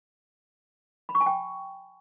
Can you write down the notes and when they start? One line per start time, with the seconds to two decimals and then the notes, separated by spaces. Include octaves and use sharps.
1.09 B5
1.15 C#6
1.21 G#5
1.26 G5